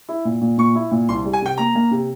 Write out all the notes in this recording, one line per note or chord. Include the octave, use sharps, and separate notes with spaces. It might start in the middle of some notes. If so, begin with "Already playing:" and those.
E4
A#2
A#2
A#2 C#6
E4
A#2
C2 C6
G3
G#5
C3 G5
A#3 A#5
A#3
C3